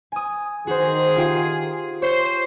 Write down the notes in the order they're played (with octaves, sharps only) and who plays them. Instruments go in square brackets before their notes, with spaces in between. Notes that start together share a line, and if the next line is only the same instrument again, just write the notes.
[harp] G#5 D#6
[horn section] D#3 G#4 [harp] F#4 C5
[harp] F4 G4 F5
[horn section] C5 [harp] C#5